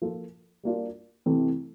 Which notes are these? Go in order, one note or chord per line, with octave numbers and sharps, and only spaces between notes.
F3 A#3 F4 A4
G3 A#3 D4 F4
C3 E3 A3 C4